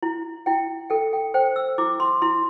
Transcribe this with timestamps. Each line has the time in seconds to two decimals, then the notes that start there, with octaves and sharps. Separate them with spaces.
0.03 E4
0.46 E4 G5
0.90 A4 G5
1.13 G5
1.34 C5 G5
1.56 E6
1.78 E4 D6
2.00 C6
2.22 E4 C6